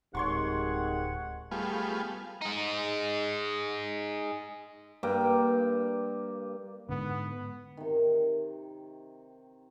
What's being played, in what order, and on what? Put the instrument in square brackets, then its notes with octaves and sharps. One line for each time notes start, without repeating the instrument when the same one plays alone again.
[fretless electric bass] D1 [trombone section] C3 D#3 G#3 [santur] C#5 C6 C#6 [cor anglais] F#5
[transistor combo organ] G3 A3 B3 F4 G#4
[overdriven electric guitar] D#4 G#4
[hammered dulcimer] G2 A#3 G5
[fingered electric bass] G#2 D3 [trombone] B3
[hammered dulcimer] C3 D#3